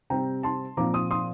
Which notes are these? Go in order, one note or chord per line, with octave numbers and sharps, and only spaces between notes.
C3 G3 C4 G5 A#5
A5 C6
A#2 F3 C4 A#5 D6
C6 D#6
C6 D#6